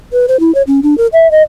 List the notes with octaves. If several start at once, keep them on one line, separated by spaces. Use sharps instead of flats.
B4
C5
E4
C#5
C#4
D4
A#4
E5
D#5